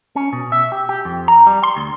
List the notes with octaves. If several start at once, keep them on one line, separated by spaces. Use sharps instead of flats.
C#4
B2
E5
G4
G4
F2
A#5
G3
C6
D2